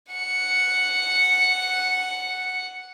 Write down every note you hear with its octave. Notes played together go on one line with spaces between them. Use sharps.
F#5 C#7